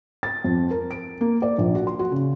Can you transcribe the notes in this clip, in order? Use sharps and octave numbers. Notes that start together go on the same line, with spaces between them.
A6
F2
A#4
D7
A#3
D5
A#1
F#4
C6
F#4
C#3